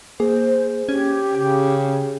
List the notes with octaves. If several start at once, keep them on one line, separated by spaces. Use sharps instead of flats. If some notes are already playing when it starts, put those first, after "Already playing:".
A#3 G#4 C5
C#4 G4 G#6
C#3 G5